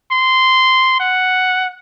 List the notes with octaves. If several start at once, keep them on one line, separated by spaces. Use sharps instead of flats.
C6
F#5